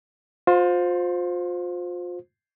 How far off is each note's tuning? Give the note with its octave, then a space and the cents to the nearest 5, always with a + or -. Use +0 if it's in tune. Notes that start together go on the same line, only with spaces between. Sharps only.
F4 +30 C5 -5